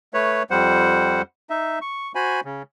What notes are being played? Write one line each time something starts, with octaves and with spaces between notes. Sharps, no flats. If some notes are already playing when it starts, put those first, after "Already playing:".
A3 B4 C#5
F2 G3 C5 F#5
D#4 E5
C#6
F#4 C5 G#5 B5
C#3